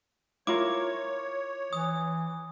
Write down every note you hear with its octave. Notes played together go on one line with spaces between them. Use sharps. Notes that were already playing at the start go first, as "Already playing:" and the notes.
E4 F4 A#4 C#5 D6
E3 D#6